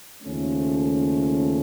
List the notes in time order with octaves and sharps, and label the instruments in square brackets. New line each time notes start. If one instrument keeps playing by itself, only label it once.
[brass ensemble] D#2 C#3 F3 A3 C#4